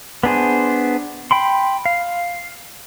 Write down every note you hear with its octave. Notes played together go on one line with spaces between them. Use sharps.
B3 D4 G#4 C5
G5 B5 C6
F5